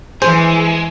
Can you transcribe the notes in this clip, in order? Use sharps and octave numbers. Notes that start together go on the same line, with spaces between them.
E3 G#3 G#4 C5